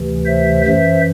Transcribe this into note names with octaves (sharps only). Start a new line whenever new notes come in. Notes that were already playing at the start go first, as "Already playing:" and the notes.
Already playing: D2 C3 E3
C5 E5
F#2 E3 C5 E5